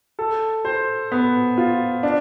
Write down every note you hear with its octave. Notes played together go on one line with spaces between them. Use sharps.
A4
C5
B3
F4
D4